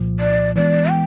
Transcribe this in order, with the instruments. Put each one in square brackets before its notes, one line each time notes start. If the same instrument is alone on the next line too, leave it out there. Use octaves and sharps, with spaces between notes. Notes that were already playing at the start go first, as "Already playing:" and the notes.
Already playing: [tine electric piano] C2 A#2 F3
[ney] D5
[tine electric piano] E3 G#3 B3 [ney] D5
[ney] G5